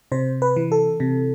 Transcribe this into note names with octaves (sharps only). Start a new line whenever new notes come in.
C3 C5
B4
E3
A4
C3